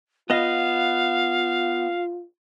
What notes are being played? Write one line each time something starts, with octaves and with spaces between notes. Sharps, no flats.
B3 F4 D#5 F5